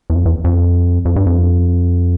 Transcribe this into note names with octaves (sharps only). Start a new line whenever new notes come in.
E2
F2
E2
F2
F2
G2
F2